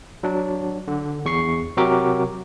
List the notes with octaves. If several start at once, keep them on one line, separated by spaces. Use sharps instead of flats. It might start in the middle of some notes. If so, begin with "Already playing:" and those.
F#3 D4
D3
E2 C#6 C7
C3 F#3 F#4 G4 A#4 D6